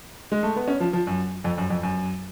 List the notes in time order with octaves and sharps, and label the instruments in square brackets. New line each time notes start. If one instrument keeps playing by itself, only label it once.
[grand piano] G#3
A3
B3
C#4
F3
F3
F#2
F2
F#2
F2
F#2